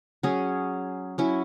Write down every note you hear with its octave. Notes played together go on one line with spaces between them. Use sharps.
F#3 C#4 G#4
F#3 C#4 E4